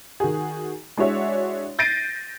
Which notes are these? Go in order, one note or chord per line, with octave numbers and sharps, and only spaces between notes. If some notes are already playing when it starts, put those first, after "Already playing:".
D#3 F#4 G#4
G#3 D4 E4 F#4 C#5 E5
G6 A6 A#6 C7 D7 D#7